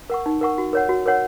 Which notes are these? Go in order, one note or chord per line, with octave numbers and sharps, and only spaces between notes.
A#4 F#5 C#6
D#4
A#4 F#5 C#6
F#4
A#4 C#5 F#5
F#4
A#4 C#5 F#5